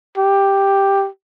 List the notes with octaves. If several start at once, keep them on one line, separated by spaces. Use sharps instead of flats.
G4